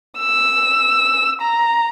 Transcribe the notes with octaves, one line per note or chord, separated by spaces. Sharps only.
E6
A#5